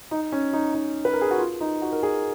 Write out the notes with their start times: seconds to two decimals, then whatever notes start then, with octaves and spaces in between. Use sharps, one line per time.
0.11 D#4
0.32 C#4
0.53 D#4
0.74 D#4
1.05 B4
1.13 A#4
1.21 G#4
1.31 F#4
1.38 F4
1.60 D#4
1.82 F#4
1.92 A#4
2.03 G#4